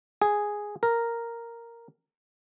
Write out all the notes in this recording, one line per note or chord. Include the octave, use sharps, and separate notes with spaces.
G#4
A#4